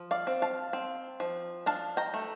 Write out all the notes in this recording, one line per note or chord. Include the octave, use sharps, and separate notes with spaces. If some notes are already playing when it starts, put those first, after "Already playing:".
Already playing: F3
D5 F5
C4
F5 A5
C4
F3
D4 F5 A5
G5 A#5
A3